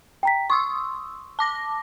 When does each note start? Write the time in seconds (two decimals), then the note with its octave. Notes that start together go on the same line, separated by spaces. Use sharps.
0.23 G5 A#5 B6
0.50 C6 C#6 D#6 E6
1.39 A5 D6 A#6